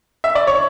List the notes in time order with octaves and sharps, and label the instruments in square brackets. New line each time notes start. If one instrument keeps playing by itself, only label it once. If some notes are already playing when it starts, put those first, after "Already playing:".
[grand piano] E5
D5
C#5